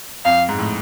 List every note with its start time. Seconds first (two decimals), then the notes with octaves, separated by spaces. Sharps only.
0.25 F2 F5
0.49 G#2
0.58 A2